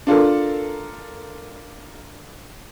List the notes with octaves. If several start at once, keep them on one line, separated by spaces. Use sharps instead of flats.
D4 F4 A4 A#4